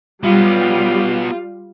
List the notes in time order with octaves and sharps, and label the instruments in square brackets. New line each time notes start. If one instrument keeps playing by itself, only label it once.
[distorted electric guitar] F#3 B3 [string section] G3 [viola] F4